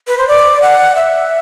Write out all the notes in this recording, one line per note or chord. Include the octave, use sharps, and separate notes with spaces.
B4
C5
D5
F#5
E5